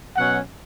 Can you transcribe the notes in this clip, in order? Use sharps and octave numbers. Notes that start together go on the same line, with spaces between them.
B2 F#3 C#4 F#5